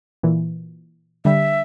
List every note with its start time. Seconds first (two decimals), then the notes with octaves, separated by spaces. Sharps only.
0.23 A#2 E3
1.25 D3 G3 E5